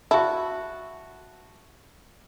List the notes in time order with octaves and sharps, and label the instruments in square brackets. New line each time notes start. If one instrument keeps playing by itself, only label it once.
[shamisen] E4 [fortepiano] F#4 A5